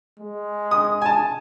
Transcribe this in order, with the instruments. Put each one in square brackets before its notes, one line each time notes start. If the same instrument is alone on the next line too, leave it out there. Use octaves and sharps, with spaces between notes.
[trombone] G#3
[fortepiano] D#6
G#5 A5